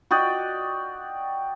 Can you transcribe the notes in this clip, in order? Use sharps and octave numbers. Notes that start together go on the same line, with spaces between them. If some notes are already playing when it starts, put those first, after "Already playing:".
F#4 D5 D#5 G5